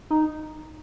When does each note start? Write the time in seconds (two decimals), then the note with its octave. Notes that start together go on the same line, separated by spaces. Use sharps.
0.10 D#4